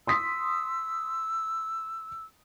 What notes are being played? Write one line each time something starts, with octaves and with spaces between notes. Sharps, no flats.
C6 D#6 E6 B6